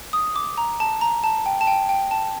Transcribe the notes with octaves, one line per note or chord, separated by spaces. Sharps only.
D#6
D6
A#5
A5
A#5
A5
G5
A5
G5
G5
A5